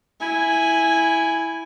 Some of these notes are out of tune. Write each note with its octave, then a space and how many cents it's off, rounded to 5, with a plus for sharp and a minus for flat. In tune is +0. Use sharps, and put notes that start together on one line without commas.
E4 +0 G#5 +0